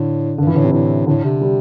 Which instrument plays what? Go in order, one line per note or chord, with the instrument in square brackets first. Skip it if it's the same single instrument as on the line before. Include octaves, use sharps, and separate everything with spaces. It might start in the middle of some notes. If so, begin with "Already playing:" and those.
Already playing: [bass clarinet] A2 [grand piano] D3
[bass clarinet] G2 [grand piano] D3
[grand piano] E3
[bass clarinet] A2 [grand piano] D3
[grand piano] C3
[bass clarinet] A2
[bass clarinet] A2 [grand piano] D3
[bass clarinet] C3
[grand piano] G3